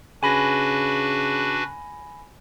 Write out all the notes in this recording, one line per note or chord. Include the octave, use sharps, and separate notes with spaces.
C#3 D4 F#4 B4 G#5 B5 A#6